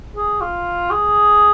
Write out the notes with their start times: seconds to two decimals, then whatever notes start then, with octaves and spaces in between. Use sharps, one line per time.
0.17 G#4
0.41 F4
0.91 G#4